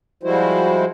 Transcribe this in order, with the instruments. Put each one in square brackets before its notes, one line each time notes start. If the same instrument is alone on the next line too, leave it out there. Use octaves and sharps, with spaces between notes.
[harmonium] F3 G3 G#3 E4 F#4 C5